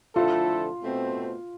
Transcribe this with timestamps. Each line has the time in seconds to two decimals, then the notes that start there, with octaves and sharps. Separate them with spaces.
0.16 D3 F3 A3 E4 F4 A4
0.82 B2 A3 C4